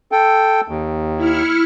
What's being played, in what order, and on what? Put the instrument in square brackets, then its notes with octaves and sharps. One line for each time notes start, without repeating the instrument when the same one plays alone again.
[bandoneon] A4 G5
D#2
[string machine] E4 F6 C#7